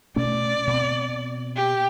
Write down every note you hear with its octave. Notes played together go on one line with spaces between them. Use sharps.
B2 A3 C#4 D5
B2 C4
G4